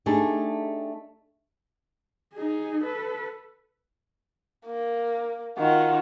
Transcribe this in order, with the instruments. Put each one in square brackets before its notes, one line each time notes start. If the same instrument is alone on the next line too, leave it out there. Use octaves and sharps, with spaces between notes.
[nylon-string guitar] A3 D4 D#4 G4 G#4
[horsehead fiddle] D#4 G#4
A4 B4
[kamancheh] A#3
[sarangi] D#3 [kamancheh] F4 F#4